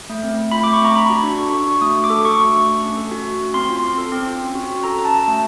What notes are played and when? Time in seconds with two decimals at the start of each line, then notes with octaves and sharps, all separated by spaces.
0.10 A3
0.23 C4
0.37 A3
0.52 F4 B5
0.63 D6
0.66 A3
0.73 C#6
0.81 C4 A#5
0.95 D4 B5
1.10 F#4
1.24 D4
1.38 A4 C#6
1.53 D4
1.60 C#6
1.67 F#4
1.81 A3 D#6
1.95 D4
2.04 D6
2.10 A4
2.25 F#4 C#6
2.39 A3
2.54 D4
2.68 A3
2.83 C#4
2.97 A4
3.11 F#4
3.26 A3
3.40 C#4
3.54 C4 C6
3.69 F4
3.76 C6
3.83 C4
3.98 A4
4.12 C4
4.27 F4
4.41 C#4
4.55 F#4
4.69 C#4
4.83 A4 A#5
4.98 C#4
5.05 A5
5.13 F#4
5.27 A3